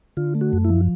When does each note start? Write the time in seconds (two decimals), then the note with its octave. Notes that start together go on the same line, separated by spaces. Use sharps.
0.17 D3 F4
0.35 A3
0.41 F#4
0.53 F#2
0.64 E4
0.69 F3